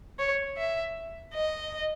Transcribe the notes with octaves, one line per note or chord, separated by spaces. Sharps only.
C#5
E5
D#5